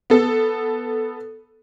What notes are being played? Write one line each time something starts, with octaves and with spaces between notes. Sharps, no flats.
B3 A4